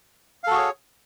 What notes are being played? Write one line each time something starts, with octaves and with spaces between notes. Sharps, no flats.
F#4 G#4 A4 C#5 F5